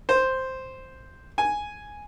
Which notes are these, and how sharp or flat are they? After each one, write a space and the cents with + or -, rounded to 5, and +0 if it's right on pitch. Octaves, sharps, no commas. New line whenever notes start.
C5 +0
G#5 +0